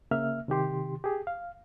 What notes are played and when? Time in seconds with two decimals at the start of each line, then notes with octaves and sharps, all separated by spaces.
0.11 C#3 A#3 E5 F6
0.48 C3 D#3 G4 C6
1.04 G4 G#4
1.27 F5